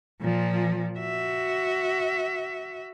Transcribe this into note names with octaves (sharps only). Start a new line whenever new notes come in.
A#2 F3
F#4 E5